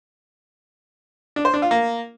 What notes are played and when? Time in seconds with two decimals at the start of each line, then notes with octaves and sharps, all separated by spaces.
1.36 D4
1.45 C5
1.54 D4
1.62 F4
1.71 A#3